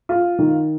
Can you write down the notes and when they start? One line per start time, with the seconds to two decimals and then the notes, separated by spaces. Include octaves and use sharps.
0.09 F4
0.39 D#3